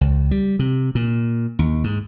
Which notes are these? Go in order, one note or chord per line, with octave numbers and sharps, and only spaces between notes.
C#2
G3
C3
A#2
D#2
G#2